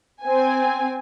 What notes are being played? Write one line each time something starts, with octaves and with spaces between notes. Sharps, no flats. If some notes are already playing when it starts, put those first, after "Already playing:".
C4 G#5